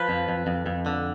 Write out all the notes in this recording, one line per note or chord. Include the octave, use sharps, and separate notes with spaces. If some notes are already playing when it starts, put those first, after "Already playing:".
Already playing: F3 B4
F2
F2
F2
F2
D3